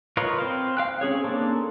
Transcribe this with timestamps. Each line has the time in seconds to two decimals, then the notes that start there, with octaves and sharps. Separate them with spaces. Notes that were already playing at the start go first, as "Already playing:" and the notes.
0.17 F4 A#4 B4 C#5 D#5
0.38 C4 C5 F5
0.77 F5 G5 F#6
1.01 C4 C#4 G#4 C#5
1.24 A#3 C4 D4 A4